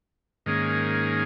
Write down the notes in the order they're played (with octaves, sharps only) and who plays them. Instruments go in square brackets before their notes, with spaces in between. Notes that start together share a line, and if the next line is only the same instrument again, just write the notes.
[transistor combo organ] G#2 D#3 A#3 C#4 G#4